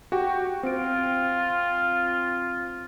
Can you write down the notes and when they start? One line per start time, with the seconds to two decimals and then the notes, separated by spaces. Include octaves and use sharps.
0.12 F#4 G4 G5
0.63 C4 F4 D7